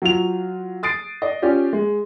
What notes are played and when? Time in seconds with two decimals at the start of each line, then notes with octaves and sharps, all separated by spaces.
0.02 F#3 F4 F7
0.83 D#6 A6 C7 D7
1.22 D5 D#5
1.42 C#4 F4 G4 D5
1.73 G#3